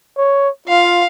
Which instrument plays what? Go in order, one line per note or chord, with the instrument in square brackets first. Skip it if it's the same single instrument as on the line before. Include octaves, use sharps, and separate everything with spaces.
[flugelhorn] C#5
[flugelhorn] F4 [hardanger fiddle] F5